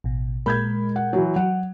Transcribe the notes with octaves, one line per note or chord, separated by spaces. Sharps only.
A1 B2
A#2 G#3 A#4 B5 G6 G#6
F#5
E3 F#3
F#3 F#5